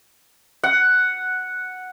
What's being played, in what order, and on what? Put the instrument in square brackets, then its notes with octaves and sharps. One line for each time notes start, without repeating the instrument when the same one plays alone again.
[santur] F#5